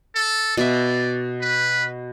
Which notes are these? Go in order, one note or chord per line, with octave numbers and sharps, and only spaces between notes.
A4
B2 D5 E5
B4